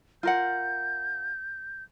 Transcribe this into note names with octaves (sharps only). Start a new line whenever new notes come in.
F4 A#4 F#5 G6